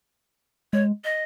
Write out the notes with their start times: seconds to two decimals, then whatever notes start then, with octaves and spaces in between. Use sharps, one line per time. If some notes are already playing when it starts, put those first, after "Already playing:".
0.73 G#3 C#5
1.04 D#5